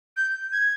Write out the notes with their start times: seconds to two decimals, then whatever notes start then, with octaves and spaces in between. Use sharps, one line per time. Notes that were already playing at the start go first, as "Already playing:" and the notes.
0.16 G6
0.52 G#6